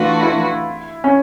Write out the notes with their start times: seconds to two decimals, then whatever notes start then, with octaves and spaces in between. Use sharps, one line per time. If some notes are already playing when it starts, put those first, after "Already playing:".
Already playing: E3 A3 D4 F4 F#4 B4
0.23 E4
1.04 C#4